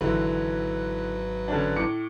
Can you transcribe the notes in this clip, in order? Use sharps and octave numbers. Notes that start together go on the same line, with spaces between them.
G#1 D3 E3 F#3 B4
D3 C#4 D4
A2 D6 C#7